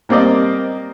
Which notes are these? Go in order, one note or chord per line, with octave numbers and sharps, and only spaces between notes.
G3 A#3 C4 D5 D#5